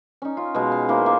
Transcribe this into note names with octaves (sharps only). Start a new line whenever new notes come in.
C#4 D#4
F4
B2 G#3
F5
D#3 A#3 E4 C5
A#3 F4